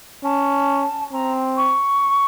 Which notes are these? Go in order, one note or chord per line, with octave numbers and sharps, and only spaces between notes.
C#4 A5
C4 A#5
C#6